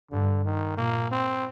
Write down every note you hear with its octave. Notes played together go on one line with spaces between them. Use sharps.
G2 D3
D#3
A#2 A#3
C4